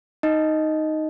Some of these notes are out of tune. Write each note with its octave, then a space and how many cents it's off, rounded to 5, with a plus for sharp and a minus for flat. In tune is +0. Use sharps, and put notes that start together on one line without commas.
D#4 +0 D#5 +0